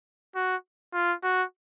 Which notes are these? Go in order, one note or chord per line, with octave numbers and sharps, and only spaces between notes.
F#4
F4
F#4